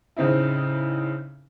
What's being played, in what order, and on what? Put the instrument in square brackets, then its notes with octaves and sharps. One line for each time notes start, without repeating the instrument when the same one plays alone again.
[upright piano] A2 C#3 C4 D#4 E4